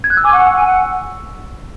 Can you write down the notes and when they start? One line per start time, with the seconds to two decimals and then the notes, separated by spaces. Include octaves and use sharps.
0.04 G#6
0.10 F#6
0.17 E6
0.24 G#5 D6
0.32 F#5 C#6
0.47 E6
0.56 G#5
0.63 E6
0.67 F#5